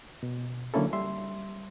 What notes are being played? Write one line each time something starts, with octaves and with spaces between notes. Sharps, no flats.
B2
D3 F#3 A#3 C#4 E4 A4
G3 E5 C6